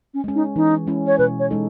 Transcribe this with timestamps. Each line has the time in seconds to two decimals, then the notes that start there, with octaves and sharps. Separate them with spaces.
0.14 C#4
0.24 G#3 C#4
0.35 D#4
0.56 E3 D#4
0.87 G#3 C#4 E4
1.07 C#5
1.18 B2 B4
1.39 C#5
1.51 G#3 D#4 A4